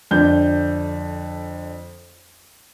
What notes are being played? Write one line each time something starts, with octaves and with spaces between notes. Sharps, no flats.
F2 D3 D4 G6